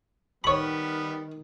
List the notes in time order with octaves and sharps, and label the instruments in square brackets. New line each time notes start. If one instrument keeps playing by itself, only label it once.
[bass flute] D#3 [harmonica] G3 B3 [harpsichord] C#5 B5